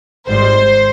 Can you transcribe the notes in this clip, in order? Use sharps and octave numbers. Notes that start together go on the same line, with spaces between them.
G#1 G#2 G3 C5